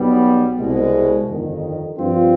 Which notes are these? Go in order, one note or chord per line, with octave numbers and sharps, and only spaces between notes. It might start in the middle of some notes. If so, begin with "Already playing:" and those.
Already playing: B1 B2 G3 B3
C2 B2 G#3
G1 F2 D#3
G2 F3 C4 F4